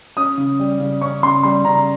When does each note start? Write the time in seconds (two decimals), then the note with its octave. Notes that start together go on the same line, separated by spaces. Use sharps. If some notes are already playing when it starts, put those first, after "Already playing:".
0.17 C#4 D#6
0.38 C#3
0.59 G3
0.80 C#3
1.01 C#4 C#6
1.23 C#3 C6
1.43 G3 C6
1.65 C#3 A#5